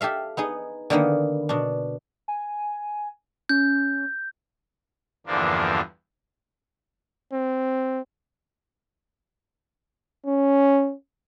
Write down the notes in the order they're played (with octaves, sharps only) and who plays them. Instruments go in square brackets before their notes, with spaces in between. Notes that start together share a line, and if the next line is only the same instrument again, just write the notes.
[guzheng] G4 A4 E5 F5
B3 D#4 G#4
D3 D#3 A#3 B3
B2 D4
[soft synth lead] G#5
[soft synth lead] C#4 [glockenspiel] G6
[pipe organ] E2 G2 D3 F3 A#3 D4
[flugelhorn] C4
[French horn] C#4